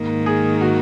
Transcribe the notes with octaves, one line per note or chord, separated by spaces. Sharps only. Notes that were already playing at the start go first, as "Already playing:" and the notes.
Already playing: G#2 D#3 A#3
G#4
F#4